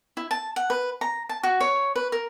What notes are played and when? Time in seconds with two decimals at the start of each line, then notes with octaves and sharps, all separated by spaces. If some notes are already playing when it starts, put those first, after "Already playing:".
0.17 E4
0.31 A5
0.56 F#5
0.70 B4
1.01 A#5
1.29 A5
1.43 F#4
1.60 C#5
1.96 B4
2.12 A#4